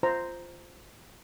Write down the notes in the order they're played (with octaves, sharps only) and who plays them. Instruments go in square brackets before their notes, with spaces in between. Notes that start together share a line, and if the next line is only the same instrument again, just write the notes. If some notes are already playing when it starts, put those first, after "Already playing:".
[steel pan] F4 C5 A#5